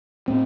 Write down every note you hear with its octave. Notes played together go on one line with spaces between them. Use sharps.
A2 C4